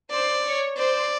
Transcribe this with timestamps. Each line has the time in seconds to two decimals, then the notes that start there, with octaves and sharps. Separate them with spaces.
0.10 C5 D5
0.44 C#5
0.77 C5 D5